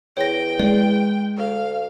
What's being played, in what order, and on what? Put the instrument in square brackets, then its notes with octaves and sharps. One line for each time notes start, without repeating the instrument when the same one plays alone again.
[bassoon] E2 [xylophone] C#5 A#6 [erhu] G5
[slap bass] G#3 [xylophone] D5
[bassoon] D2 [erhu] F5